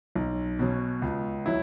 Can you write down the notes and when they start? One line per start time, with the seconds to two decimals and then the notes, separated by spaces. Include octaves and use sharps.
0.15 B1
0.59 B2 F#3 C#4
1.02 C#2
1.46 F#3 E4